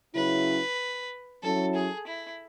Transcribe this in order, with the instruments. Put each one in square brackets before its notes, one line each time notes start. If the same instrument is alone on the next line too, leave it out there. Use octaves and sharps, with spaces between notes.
[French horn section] C#3 F#3 C#4 E4 [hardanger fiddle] B4
[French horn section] F#3 C#4 E4 [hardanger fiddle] A4
[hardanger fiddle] G#4
E4